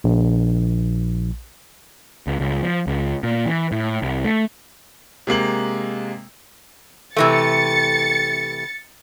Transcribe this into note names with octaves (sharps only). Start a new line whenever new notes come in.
A#1
C#2
C#2
F3
C#2
A#2
E3
A2
C2
A3
C3 G#3 A#3 F#7
C3 E3 A3 A6 C#7